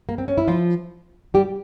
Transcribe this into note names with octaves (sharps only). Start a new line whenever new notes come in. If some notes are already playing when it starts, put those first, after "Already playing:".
A#3
C4
C#4
E4
F3 F4
G3 G4